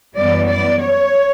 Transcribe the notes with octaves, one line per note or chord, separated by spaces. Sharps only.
F#2 E3 G3 B3 D5
D5
C#5